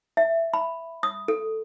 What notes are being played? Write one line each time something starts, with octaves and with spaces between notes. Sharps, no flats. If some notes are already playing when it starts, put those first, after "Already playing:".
E5
B5
D#6
A4